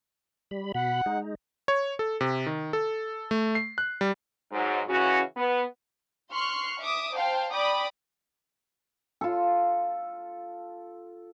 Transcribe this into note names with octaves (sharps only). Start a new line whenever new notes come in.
G3 B5
B2 F#5 B5
G#3 D#4
C#5
A4
C3
D#3
A4
A3
C7
F#6
G3
G#2 F#3
C#3 E3 C#4 F#4
B3
C6 C#6 F6 F#6 C7
E5 D6 D#6
C5 F5 G5 A5
D5 G5 B5 D6 D#6
F4 A4